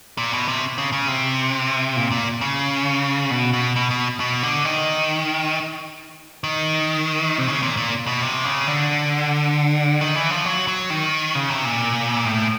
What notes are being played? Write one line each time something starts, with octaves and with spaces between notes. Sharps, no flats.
A#2
B2
C3
C#3
C#3
C3
A#2
A#2
C#3
B2
B2
B2
B2
B2
D3
D#3
D#3
C3
C#3
A#2
A#2
B2
C3
C#3
D3
D#3
E3
F3
F#3
F#3
D#3
C#3
C3
A#2
A2